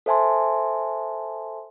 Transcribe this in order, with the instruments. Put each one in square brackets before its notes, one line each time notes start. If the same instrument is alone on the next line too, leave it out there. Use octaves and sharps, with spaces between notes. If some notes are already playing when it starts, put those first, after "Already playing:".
[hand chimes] A4 C5 E5 G#5 A5 C6